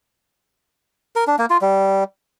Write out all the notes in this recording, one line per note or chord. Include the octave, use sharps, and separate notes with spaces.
A#4
D4
A#3
F4
G3